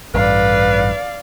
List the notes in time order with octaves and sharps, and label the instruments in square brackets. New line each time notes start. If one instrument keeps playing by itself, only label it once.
[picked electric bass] A1 G2 [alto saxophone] B4 [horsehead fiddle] D5 F5